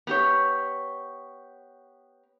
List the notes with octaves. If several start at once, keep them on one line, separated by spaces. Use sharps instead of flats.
B3 G4 C#5